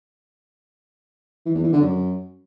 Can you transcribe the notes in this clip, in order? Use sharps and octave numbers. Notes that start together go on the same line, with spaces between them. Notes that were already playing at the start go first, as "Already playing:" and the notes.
E3
E2
E3
D3
F#2